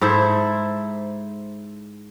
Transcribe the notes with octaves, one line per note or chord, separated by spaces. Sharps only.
G#2 E4 A4 C5